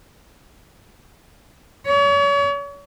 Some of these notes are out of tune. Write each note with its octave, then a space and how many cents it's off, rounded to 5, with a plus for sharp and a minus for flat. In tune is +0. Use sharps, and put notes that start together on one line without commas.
C#5 +35